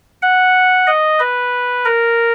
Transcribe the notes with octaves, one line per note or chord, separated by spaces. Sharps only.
F#5
D#5
B4
A#4